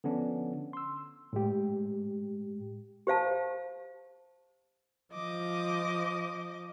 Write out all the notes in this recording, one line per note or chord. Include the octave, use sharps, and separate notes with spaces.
D3 F3 B3 C#4 D4
C6 E6
A2 G#3 G4
G4 C5 F5 A5
F3 D#5 D6